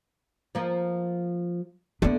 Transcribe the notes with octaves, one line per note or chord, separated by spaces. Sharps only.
F3 A#3
D3 A3 B3 D4